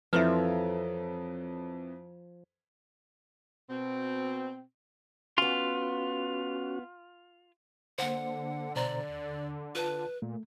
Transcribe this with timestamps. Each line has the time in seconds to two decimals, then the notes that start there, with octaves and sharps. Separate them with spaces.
0.13 F2 E3 F3 A4 B4 C#5 E5 A#5
3.70 B2 C4
5.38 B3 C#4 F4 F#4 C6
7.98 D3 A#3 C5 F#5
8.76 B2 C5 D5 A#5
9.08 D#2
9.75 F4 B4 A5
10.22 A#2 A3